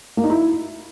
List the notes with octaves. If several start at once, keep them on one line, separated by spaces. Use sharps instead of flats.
A#3
D#4
E4